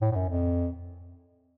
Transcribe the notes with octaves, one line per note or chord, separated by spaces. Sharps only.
A2
A2
F#2
F2